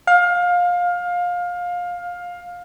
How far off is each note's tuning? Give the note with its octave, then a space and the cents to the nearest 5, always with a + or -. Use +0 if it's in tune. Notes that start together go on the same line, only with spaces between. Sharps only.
F5 +20